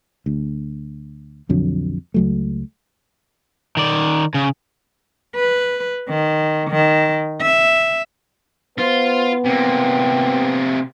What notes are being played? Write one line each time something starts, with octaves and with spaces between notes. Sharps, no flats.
D2
B1 F2 D3 F#3
C#2 F#3 A3
D#3 D5
C#3
B4
D#3
D#3
E5
B3 F4 C5
C3 A#3 G5